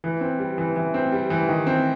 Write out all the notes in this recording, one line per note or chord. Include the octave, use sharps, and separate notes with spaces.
E3
C4
G3
E3
E3
C4
G3
E3
D#3
C4